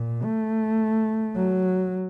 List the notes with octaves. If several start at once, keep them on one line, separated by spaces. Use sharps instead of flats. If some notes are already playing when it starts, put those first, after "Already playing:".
Already playing: A#2
A3
F#3